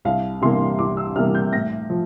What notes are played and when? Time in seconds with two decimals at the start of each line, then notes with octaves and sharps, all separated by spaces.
0.05 C2 F5
0.42 C3 E3 G3 A#3 C6
0.79 C2 D6
0.97 E6
1.16 C3 E3 G3 A#3 F6
1.35 G6
1.53 A2 A#6
1.90 F3